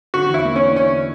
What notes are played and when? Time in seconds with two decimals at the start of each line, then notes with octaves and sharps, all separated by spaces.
0.14 D3 F#4
0.29 E2 E4
0.45 A#3
0.56 C#4 D4
0.76 D3 C#4